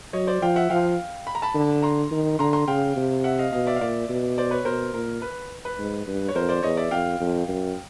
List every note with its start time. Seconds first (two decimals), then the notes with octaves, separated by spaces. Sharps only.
0.13 F#3 C#5 D#5
0.27 C5 D5
0.42 F3 F5 G5
0.56 E5 F#5
0.70 F3 F5 G5
1.27 B5
1.35 A#5
1.42 A5 B5
1.55 D3
1.82 A#5 C6
2.11 D#3
2.39 D3 A#5 C6
2.53 A#5 C6
2.68 C#3 F5 G5
2.96 C3
3.24 E5 F#5
3.39 D#5 F5
3.53 B2 D#5 F5
3.67 D5 E5
3.76 F5
3.81 A#2 D5 E5
4.09 B2
4.38 C5 D5
4.51 B4 C#5
4.65 B2 A#4 C5
4.94 A#2 A#4
5.22 B4
5.65 B4
5.79 G#2
6.07 G2
6.29 C#5
6.35 F2 A#4 C5
6.49 C5 D5
6.63 E2 C#5 D#5
6.77 D5 E5
6.91 F2 F5 G5
7.20 F2
7.48 F#2